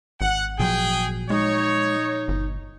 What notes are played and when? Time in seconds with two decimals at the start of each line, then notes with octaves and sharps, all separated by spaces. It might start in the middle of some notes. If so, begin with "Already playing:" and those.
0.21 G#1 F#5
0.59 A#2 F3 F#3 G#4 G5
1.30 G#3 D#4 C#5
2.28 G1